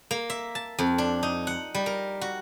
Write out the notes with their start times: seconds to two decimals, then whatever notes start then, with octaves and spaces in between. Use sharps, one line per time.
0.11 A#3
0.30 E5
0.55 A5
0.79 F2
0.98 D4
1.23 D#4
1.47 F#5
1.75 G3
1.86 A#4
2.21 F#4